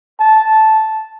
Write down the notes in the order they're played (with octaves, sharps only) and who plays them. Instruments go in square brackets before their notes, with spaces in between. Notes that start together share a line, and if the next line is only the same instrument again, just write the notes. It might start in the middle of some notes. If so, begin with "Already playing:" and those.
[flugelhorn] A5